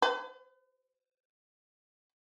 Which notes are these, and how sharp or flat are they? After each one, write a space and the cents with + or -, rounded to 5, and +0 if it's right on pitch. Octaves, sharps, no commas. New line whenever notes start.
B4 +45